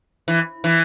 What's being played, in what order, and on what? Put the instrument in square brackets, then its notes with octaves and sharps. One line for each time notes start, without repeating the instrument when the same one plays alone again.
[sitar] E3
E3